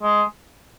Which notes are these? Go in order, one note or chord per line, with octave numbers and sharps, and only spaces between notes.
G#3